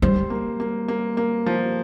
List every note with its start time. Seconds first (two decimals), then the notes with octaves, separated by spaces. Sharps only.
0.02 G3 C5
0.30 A#3
0.60 A#3
0.88 A#3
1.17 A#3
1.46 F3